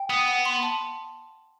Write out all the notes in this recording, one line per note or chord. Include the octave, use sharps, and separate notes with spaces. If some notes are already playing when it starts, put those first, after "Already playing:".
Already playing: G5
B3 D#6
F#5
C6
A5